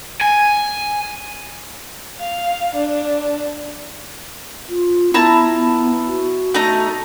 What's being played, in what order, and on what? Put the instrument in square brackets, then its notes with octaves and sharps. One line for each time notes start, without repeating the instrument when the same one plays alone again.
[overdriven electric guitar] G#5
[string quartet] F5
D4
[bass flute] F4
[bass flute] B3 [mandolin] E4 A5 A#5
[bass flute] B3
F#4
[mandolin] A3 D#4 A#5